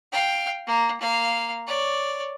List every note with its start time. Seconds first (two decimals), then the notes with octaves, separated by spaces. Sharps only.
0.13 F5 G5
0.67 A#3
1.00 A#3 F5
1.68 C#5 D5